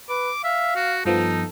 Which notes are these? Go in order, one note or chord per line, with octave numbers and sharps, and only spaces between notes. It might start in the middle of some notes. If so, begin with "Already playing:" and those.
B4 D6
E5 F5
F#4
G2 F3 B3 D#4 A4